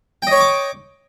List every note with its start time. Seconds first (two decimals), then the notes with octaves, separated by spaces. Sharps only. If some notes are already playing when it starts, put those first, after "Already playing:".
0.22 G5
0.27 D#5
0.31 C#5
0.36 C#6
0.40 D6